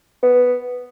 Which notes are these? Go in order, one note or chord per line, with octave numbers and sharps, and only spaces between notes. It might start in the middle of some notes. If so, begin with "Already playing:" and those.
B3